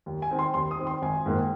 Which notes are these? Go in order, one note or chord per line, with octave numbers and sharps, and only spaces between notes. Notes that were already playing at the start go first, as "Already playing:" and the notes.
D#2
G#5
D#3 C4
C6
D#2 C6
D#6
D#3 C4
C6
G#1 G#5
G#2 D#3 A#3